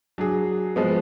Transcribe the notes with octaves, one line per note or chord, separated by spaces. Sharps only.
F#3 D4 G#4
F3 G#3 B3